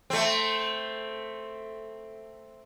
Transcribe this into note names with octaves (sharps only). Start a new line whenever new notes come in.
A3 C4